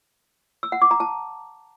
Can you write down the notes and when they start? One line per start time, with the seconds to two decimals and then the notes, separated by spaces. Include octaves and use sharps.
0.63 E6
0.72 F#5
0.82 D6
0.91 A#5
1.00 A5